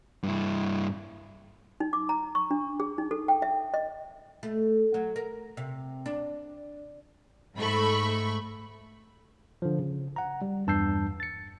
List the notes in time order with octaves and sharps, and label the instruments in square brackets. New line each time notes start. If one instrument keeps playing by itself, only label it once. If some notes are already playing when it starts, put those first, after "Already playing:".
[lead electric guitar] G2 E4
[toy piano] D#4
D6
A#5
C#6
D4
G#4
D#4
A4
G5
E5
D#5
[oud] A3
F#3
A#4
C3
D4
[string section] G#2 A3 B5 C#6
[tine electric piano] D3 F3
C#3
F#5 A#5
G3
E2 G2 A5 E6 G6 C7
A6 C#7